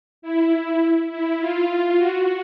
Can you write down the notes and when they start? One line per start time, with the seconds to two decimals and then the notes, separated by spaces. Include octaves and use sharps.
0.22 E4
1.10 E4
1.39 F4
1.97 F#4